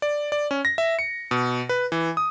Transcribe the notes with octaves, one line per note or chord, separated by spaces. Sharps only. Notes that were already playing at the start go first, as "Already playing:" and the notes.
D5
D5
C#4
A#6
E5
C#7
B2
B4
E3
D#6